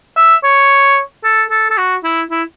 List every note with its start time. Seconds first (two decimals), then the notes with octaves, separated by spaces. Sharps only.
0.17 E5
0.44 C#5
1.24 A4
1.50 A4
1.70 A4
1.78 F#4
2.04 E4
2.30 E4